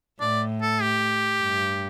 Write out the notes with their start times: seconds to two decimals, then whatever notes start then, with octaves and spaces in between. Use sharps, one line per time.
0.20 A2 D5
0.61 A4
0.82 G4
1.43 G2